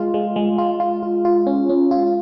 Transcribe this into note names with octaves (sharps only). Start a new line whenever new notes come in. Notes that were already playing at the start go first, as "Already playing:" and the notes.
Already playing: G#3 F4
G#3
G#3
F4
F4
F4
F4
C#4
C#4
F4